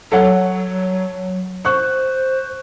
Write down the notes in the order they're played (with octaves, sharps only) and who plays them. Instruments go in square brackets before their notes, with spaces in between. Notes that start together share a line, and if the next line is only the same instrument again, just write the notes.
[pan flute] F#3 [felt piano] A4 C#5 F#5
[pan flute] C5 [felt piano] C#6 F#6